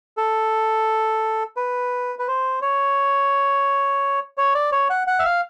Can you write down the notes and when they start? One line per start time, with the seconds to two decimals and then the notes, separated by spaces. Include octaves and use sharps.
0.17 A4
1.56 B4
2.19 B4
2.28 C5
2.62 C#5
4.38 C#5
4.55 D5
4.72 C#5
4.90 F#5
5.07 F#5
5.19 E5
5.25 F5